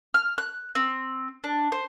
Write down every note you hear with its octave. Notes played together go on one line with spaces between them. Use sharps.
F6
F#6
C4
D4
C5